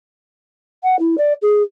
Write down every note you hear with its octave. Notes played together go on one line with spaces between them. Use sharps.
F#5
E4
D5
G#4